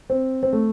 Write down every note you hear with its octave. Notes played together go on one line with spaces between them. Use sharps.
C4
C4
A3